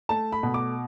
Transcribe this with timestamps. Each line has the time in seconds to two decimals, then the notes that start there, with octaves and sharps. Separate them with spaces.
0.09 A3 A5
0.32 B5
0.43 B2
0.54 D6